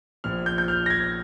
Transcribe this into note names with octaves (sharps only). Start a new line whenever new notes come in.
A#1 A#2 F3 F6
G6
G6
F6
A#6
G#6